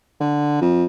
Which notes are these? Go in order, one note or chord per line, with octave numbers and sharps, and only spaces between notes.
D3
F2